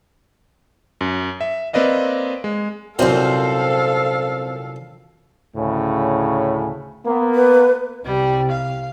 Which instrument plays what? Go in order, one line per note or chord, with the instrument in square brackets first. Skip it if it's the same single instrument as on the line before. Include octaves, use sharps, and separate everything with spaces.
[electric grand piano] F#2
E5
A#3 C4 B4 D5 D#5 F5
G#3
[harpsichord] C2 F#2 A#2 [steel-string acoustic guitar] C4 C5 [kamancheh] A4 F5
[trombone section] D2 A2 C#3
A#3 B3
[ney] B4
[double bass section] C2 C3 [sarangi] G3
[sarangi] F5